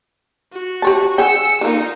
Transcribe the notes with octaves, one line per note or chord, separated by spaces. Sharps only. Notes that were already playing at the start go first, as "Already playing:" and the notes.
F#4
G4 C#5 A5
G#4 F#5 G5 E6 C#7
D3 A#3 D#4 F4